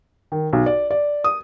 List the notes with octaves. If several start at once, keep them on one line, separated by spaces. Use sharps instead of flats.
D#3
B1
D5
D5
D#6